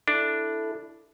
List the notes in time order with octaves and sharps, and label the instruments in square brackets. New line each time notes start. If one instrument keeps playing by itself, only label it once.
[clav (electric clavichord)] D4 [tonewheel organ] E4 A4